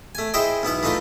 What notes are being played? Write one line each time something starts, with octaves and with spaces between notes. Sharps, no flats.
A3 G#5
G#3 E4 C5 D#5 E5 G5
B1 B3 E4 B4
E3 A3 D#4 F4 B4